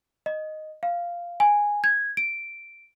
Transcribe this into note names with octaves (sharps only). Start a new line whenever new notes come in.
D#5
F5
G#5
G#6
D7